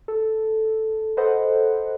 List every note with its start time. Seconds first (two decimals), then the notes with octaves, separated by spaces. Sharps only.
0.08 A4
1.17 A4 B4 C5 D#5 F#5